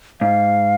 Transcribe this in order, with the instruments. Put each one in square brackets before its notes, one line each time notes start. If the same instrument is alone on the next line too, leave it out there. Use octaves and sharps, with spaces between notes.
[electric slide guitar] G#2 [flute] F5